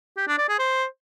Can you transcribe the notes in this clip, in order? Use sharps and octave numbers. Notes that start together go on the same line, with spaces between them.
G4
D4
D5
G#4
C5